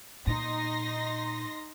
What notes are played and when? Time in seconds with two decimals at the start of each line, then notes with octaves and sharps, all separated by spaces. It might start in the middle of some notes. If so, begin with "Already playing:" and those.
0.27 A#2 D#4 C6 A#6